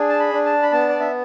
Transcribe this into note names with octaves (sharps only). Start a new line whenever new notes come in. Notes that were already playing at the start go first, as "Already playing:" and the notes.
Already playing: D4 G#4
A5
B5
D4
A5
B5
B3 A5
D5
E5